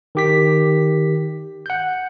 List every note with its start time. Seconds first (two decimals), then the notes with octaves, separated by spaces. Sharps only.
0.15 D#3 G4 B6
1.66 F#5 G6